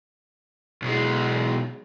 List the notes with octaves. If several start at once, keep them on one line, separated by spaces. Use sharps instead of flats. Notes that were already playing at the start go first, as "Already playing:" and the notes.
B1 G#3